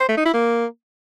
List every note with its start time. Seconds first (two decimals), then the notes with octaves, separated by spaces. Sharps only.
0.01 C5
0.09 A3
0.17 D#4
0.26 E4
0.34 A#3